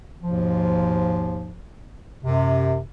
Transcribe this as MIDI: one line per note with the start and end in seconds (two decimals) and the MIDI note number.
0.23 1.55 39
0.23 1.55 44
0.23 1.55 47
0.23 1.55 53
2.24 2.79 42
2.24 2.79 48